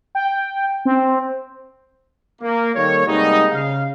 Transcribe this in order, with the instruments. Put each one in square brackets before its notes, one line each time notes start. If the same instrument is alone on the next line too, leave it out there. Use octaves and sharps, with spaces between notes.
[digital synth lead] G5
C4
[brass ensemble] A#3
D#3 G3 A#3 A4 C#5
C3 G3 G#3 A#3 B3 D#4
C#3 F5